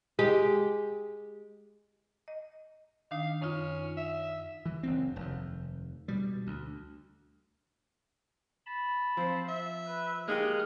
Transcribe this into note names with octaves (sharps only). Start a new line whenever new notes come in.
G#3 G4
D#5
D#3 D4 D#4 F5
F#2 C#4 D#4 F4
E5
E3
F#1 D2 C4
F1 D#2
B2 G3
D2
A5 B5
F3 C4
E5
B4
G#3 A#3 D#4 G4 D#6 F6 F#6